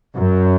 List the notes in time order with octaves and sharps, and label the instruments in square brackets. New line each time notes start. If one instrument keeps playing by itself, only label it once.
[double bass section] F#2